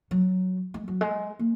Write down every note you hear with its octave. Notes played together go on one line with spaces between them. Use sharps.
F#3
G#3
F#3
G#3
A#3